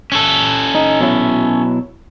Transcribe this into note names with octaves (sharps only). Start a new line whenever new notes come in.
C#4 A4
D#4
B2 F#3 E4